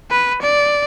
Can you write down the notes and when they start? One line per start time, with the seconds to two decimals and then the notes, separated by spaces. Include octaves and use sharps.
0.11 B4
0.42 D5